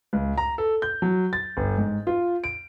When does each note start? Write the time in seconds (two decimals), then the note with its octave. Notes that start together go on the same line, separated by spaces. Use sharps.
0.13 C#2
0.38 A#5
0.58 A4
0.82 G6
1.02 F#3
1.33 A6
1.57 G1
1.78 G#2
2.07 F4
2.44 D7